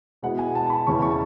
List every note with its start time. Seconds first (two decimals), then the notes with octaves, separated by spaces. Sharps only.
0.23 B2 G#3 B3 E4 F#5
0.39 G#5
0.55 A5
0.67 A5
0.70 B5
0.87 E2 C#3 G#3 C#4 E4 C#6
1.02 C#6
1.10 A5